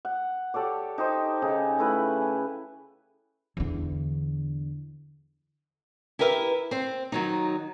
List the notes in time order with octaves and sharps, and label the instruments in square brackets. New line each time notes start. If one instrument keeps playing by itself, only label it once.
[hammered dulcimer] F#5
G4 A4 C#5 D5
D#4 G4 C5 D#5
C#3 D#4
A3 E4 B4
G#5
[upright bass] E2 D3
[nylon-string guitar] E4 G4 A#4 B4 E5
C4 C5
D#3 F#3 D#4